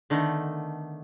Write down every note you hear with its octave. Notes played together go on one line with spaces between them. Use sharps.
D3 D#3 A3 B3